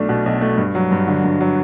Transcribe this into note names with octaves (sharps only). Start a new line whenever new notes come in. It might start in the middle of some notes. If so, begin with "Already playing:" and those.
Already playing: B1 A3 D4
B2
B1
A3
G2
F#3
G2
D3
G2
F#3